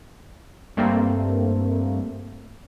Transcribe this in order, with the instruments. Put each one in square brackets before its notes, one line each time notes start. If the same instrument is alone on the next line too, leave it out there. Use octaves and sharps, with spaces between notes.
[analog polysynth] G2 A3 A#3 C4